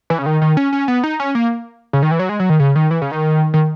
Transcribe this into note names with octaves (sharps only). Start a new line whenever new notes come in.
E3
C#3
D#3
D#3
C#4
C#4
B3
D#4
C#4
A#3
C#3
D#3
E3
F#3
G#3
F#3
D#3
C#3
D#3
E3
C#3
D#3
D#3